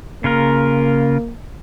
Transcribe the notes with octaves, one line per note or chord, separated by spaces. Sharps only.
C#3 A#3 F4 A#4